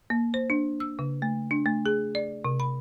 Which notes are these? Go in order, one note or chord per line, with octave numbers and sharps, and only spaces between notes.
A#3
C5
D4
E6
C#3
A3
D4
A3
G#4
D5
C3
B5